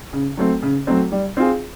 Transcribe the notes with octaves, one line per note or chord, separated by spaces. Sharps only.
C#3
F#3 A3 C4
C#3
F#3 A3 C4
G3
C4 F4 G#4